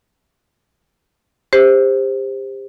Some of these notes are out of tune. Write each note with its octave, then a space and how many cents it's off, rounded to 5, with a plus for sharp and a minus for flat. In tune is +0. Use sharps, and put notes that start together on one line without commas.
G4 +30 C5 +5